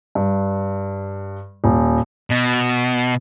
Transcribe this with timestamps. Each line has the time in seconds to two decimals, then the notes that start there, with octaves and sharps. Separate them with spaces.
0.15 G2
1.64 D#1
2.30 B2